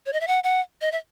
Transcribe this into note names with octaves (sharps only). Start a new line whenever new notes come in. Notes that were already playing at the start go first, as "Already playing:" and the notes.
C#5
D#5
E5
F#5
F#5
D#5
E5